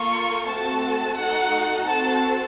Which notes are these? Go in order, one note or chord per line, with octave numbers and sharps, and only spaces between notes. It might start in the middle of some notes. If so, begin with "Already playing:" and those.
Already playing: A#3 F4 A4 C#6
A3 C4 F#4 A4 A5
A3 D#4 F#4 A4 F#5
C4 F#4 A4 A5